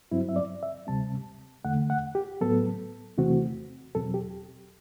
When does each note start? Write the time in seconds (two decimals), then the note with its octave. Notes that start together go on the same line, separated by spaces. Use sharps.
0.11 G2 F#3 C4 E4
0.29 E5
0.36 D5
0.63 E5
0.87 D2 C3 G3 C4 A5
1.64 E2 D3 A3 F#5
1.90 F#5
2.15 G4
2.41 A2 F#3 B3 A4
3.18 E2 C3 E3 A3 C4 F#4
3.95 E2 B2 F#3 C4 A4
4.14 G4